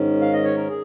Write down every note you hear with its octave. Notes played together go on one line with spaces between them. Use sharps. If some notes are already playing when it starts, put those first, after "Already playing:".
Already playing: G#2 D#3 C#4
F5
D#5
C#5
A#4
G#4